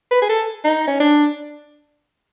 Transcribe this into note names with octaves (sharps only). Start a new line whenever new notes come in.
B4
G#4
A4
D#4
C#4
D4